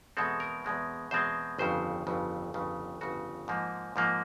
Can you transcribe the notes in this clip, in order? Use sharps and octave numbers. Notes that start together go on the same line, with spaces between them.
E2 B2 G#3 C4 A4
A#4
E2 B2 G#3 C4
E2 B2 G#3 C4 C5
G1 F2 C#3 C5
G1 F2 C#3
G1 F2 C#3
G1 F2 C#3 F#4
G#2 F3 A#3
G#2 F3 A#3